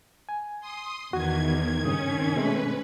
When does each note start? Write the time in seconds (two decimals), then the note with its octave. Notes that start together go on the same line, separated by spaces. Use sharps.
0.29 G#5
0.61 C6 D#6
1.13 E2 D#3 F#4 G#6
1.85 G2 C#3 C#4 D#6
2.36 B2 G#3 A3 B4